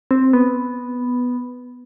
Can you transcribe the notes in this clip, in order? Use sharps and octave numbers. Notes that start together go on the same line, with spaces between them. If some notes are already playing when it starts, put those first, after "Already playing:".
C4
B3